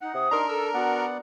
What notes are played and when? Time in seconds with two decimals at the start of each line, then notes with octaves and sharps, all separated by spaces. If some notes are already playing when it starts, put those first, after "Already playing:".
0.01 D#4 F#5
0.15 C3 D#6
0.31 D4 D#4 A#4 A#5 C6
0.48 A4 E6
0.74 B3 F#4 D5 F#5